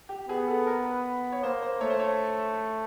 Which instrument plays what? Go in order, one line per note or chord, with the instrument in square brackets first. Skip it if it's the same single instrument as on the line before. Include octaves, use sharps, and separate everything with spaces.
[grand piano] G4
[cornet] B3 [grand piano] G#4
[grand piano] A4
A#4
B4
C#5
[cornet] A#3 [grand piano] C5
[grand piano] C5
[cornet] A3 [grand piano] C#5
[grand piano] C5
C#5